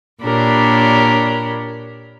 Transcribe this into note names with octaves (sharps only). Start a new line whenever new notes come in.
A#2 D4 G4 A#4 C#5 B5